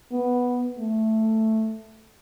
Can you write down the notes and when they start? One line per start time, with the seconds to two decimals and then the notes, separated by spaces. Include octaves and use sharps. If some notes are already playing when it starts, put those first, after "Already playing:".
0.11 B3
0.78 A3